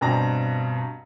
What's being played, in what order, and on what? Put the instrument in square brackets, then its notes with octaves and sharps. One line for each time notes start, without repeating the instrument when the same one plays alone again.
[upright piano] G2 B2 C4 D4 A#5 A#6